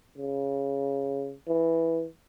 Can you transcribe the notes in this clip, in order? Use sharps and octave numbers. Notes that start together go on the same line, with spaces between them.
C#3
E3